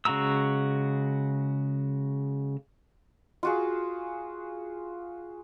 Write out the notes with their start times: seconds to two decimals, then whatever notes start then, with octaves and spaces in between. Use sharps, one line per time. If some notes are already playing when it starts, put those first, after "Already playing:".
0.05 C#3 G#3 F#4 A#5 E6
3.43 F4 F#4 G#4